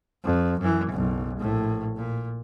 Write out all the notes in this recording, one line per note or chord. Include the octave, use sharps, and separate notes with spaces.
F2
F#2 E3
F#1 B1
A#1 A2
A#2